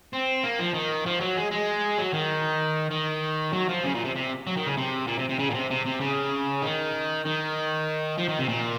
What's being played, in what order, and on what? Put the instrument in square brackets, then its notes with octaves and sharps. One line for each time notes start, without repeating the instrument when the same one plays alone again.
[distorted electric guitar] C4
A#3
F3
D#3
F3
F#3
G#3
G#3
F#3
D#3
D#3
F#3
F3
C#3
A#2
C3
C3
F#3
D#3
C#3
C3
A#2
C3
C3
C#3
A#2
C3
C3
C3
C#3
D#3
D#3
F3
D#3
C3
A#2